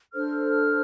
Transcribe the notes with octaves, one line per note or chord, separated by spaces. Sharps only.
D4 A4 C5 F6